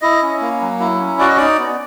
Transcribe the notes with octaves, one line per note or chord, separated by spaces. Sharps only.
E4 D#5
C#4
A#3
F#3
E4
C#4
F#4 D5
D#5
D#4 D5
B3